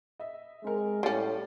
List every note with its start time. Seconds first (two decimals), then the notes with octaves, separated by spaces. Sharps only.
0.20 D#5 E5
0.64 G#3 C4 A#4
1.03 A2 G3 C#4 F5 A6 C7